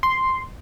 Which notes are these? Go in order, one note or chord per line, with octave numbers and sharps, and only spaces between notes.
C6